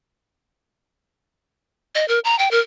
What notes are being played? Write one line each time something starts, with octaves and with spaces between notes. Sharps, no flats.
D#5
A#4
A#5
G5
A#4